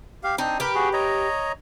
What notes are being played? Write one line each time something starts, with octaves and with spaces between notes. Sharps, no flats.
G4 F5
C4 D4 D#4 C5
G4 A#4 B4
F#4 G#4
C#5 D#5 A#5